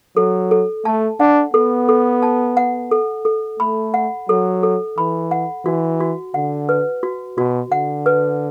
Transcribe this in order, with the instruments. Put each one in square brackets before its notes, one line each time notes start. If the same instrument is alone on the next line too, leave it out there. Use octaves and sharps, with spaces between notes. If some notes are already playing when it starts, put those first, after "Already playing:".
[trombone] F#3 [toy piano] A4
[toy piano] A4
[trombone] A3 [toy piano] A5
[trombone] D4 [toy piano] F#5
[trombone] B3 [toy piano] A4
[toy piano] A4
A5
F#5
A4
A4
[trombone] A3 [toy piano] B5
[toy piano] F#5
[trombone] F#3 [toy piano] A4
[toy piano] A4
[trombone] E3 [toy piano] B5
[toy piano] F#5
[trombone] E3 [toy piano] F#4
[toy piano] F#4
[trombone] D3 [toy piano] F#5
[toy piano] B4
F#4
[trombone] B2 [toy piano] F#4
[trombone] D3 [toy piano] F#5
[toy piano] B4